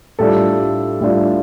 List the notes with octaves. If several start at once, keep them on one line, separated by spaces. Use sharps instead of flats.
A2 G3 D4 F4 A4
A2 G3 D4 F4